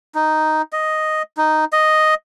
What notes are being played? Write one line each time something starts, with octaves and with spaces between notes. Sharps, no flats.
D#4
D#5
D#4
D#5